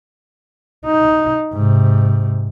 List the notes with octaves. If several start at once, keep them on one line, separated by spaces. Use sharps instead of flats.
D#4
G#2 C3